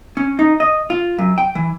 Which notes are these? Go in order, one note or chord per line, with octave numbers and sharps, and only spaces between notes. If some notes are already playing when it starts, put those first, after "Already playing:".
C#4
D#4
D#5
F4
F#2
G5
E3